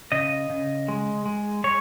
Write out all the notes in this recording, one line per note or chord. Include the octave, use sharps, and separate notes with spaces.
C#3 D#5
C#3
G#3
G#3
G#3 C#5